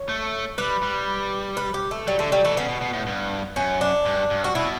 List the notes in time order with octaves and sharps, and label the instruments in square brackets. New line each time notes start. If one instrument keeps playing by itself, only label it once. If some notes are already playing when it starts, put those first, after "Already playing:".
Already playing: [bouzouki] C#5
[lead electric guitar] A3
[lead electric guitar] G3 [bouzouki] B4
[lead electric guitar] G3
[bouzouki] B4
G4
A3
[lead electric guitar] F#3 [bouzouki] G3
[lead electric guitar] D3 [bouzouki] A3
[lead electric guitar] F#3 [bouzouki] G3
[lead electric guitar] E3 [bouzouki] A3
[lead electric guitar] C#3 [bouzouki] B3
[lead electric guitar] B2
B2
A2
G2
[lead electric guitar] F#2 [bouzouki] C#4
[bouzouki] D4
[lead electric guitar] G2
G2
[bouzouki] F#4
[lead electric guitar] B2 [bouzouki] E4